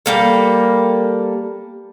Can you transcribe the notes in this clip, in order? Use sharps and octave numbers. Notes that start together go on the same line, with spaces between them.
G3 A#3 A4